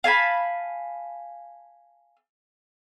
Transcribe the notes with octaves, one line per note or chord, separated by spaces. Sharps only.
F5 G#5 A5 B5